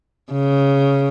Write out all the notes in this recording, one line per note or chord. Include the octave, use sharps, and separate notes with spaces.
C#3